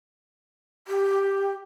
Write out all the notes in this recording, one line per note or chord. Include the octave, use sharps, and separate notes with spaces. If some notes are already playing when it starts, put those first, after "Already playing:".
G4